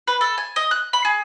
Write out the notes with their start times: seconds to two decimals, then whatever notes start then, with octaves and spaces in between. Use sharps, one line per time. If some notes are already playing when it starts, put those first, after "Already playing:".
0.08 B4
0.21 A4
0.38 G#5
0.56 D#5
0.71 F#6
0.93 B5
1.05 G#4